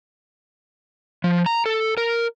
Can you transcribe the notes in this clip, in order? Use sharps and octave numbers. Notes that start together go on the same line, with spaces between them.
F3
A#5
A4
A#4